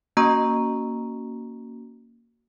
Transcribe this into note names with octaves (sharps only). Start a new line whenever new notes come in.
A#3 C#4 F#4 A#5 C#6 E6